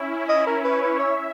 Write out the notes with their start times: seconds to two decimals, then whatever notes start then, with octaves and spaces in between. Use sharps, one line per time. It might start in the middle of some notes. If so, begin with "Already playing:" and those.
Already playing: C#4 E4
0.29 D#5
0.46 A#4
0.64 B4 C#5
0.82 B4
0.99 C#5 E5